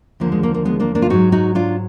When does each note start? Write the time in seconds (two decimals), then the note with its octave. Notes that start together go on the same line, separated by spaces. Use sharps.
0.20 D#2 D3 F3 A#3
0.32 G#3
0.43 A#3
0.54 A#3
0.65 G#3 B3
0.80 A#3 D4
0.95 A#3 D4
1.02 F4
1.10 G#2 F#3 D#4 F#4
1.32 D#4 F#4
1.55 D4 F4